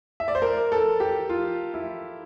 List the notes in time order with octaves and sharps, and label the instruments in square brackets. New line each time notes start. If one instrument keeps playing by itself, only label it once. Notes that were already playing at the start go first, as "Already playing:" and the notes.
[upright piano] E5
D5
C5
A#4
A4
G4
F4
E4